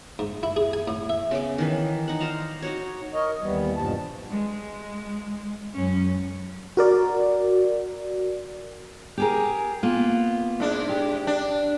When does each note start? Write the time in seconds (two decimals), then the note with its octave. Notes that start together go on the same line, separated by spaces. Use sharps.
0.19 G#2
0.43 E4
0.56 G#4
0.73 G#5
0.88 A2
1.09 E5
1.31 C#3 B3 D6
1.58 D#3 E3 B4
2.08 D#4 F#5
2.20 C5 D5 F5 A#5
2.62 D#4 F#4 C#5
3.12 A#4 C#5 D#5
3.41 D#2 E3 G3 B3
3.77 G2 B2 F3 A5
4.31 G#3
5.74 F#2 C#4
6.77 F#4 A#4 D5
9.18 G4 G#4 A#4
9.83 A#3 B3 F4
10.60 G#2 D4
10.89 G4
11.27 D4